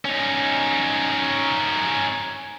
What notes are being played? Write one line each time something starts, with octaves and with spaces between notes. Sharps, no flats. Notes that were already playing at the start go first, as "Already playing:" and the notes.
C#4 D#4